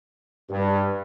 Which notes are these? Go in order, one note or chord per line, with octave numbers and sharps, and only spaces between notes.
G2